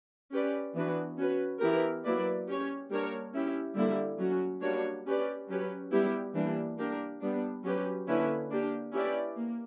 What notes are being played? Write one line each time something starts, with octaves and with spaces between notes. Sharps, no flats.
C#4 G4 B4 D5
E3 B3 D4 F#4 B4
C#4 F#4 B4
E3 B3 E4 G4 A#4
F#3 A#3 E4 B4 D5
C#4 G4 C#5
G3 A#3 D4 A#4 C#5
C#4 E4 G4
D3 G3 A#3 E4
F#3 C#4 F#4
G3 A#3 D4 F#4 C#5
C#4 G4 B4 D5
F#3 C#4 G4 B4
G3 B3 E4 G4
E3 G3 A#3 D4
A#3 D4 G4 A#4
G3 B3 D4
F#3 C#4 G4 B4
D3 A#3 C#4 E4 B4
A#3 D4 G4
C#4 E4 G4 B4 D5
A#3